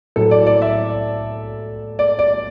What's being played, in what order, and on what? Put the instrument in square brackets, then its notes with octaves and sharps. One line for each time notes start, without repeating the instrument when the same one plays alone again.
[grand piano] A2 F#3 A4
D5
D5
E5
D5
D5